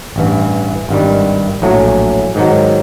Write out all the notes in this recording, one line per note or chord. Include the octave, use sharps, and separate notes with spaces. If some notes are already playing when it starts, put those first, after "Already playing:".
A1 G2 E3
G#1 G2 D#3 G3
A#1 A2 F#3 A3
G#2 D#3 F#3